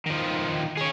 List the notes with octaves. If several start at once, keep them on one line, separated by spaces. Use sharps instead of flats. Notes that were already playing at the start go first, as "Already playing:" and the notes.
D#3 F3
G#4 C#5